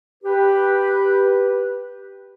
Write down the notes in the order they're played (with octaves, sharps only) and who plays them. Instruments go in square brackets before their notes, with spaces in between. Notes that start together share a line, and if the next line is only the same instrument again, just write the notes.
[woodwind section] G4 B4